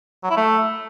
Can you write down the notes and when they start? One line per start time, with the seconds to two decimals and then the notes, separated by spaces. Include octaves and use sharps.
0.23 F#3
0.30 E4
0.37 A3